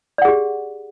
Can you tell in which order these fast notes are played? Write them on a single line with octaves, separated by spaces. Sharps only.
D5 F#5 G#4 G4